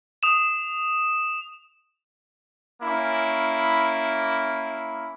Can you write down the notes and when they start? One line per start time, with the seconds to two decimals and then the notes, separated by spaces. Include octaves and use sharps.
0.23 D#6 E7
2.82 A#3 C#4 E4